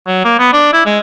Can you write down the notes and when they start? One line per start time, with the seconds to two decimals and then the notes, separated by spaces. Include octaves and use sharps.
0.07 F#3
0.24 A#3
0.39 B3
0.53 D4
0.73 E4
0.86 G#3